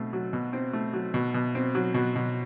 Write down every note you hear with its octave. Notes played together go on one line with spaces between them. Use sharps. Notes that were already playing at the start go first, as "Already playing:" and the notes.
Already playing: B2 A3 C4
F#3
B2
C4
A3
F#3
B2
B2
C4
F#3
B2
B2